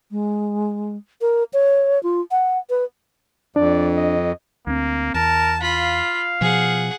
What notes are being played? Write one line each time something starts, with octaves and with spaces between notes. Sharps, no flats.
G#3
A#4
C#5
F4
F#5
B4
F2 D4 D5
D#5
D2 A#3 C4
E2 A#4 A5
F4 F5 B5
B2 F3 G#4 F#5